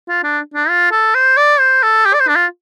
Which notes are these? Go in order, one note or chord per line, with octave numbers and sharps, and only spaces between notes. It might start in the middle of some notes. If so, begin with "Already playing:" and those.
F4
D4
D4
F4
A4
C5
D5
C5
A4
G4
D5
C5
D4
F4